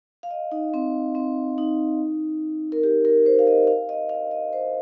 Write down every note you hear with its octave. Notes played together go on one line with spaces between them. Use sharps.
F5
D#5
D#4
C4
C4
D#4
A#4
G4
A#4
C5
F5
D#5
F5
D#5
F5
D#5
C5